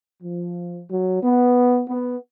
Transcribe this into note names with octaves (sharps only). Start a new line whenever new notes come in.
F3
F#3
B3
B3